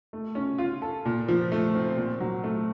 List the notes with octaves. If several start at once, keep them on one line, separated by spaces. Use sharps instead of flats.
A3
C#4
F4
A4
A#2
F3
A3
C4
A#2
F#3
A3